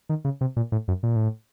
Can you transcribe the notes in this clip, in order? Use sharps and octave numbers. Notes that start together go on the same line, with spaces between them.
D#3
C#3
C3
A#2
A2
F#2
A#2
A2